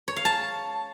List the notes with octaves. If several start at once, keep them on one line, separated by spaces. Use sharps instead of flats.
C#5
F5
A5